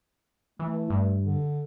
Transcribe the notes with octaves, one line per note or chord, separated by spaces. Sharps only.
E3 A3
G2
D3